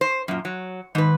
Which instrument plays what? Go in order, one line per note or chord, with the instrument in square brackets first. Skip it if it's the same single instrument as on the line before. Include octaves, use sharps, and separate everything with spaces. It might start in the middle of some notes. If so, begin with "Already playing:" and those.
[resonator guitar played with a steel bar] C5
F#2 A#2
F#3
[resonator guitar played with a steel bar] G#2 B4 [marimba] D#3